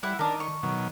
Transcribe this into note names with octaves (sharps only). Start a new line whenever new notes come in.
G3 E4 F#5
D#3 D4 A#4
C#6
B2 D#3 F#3